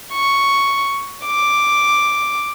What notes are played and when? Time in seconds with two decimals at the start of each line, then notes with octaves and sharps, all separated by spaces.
0.14 C#6
1.26 D6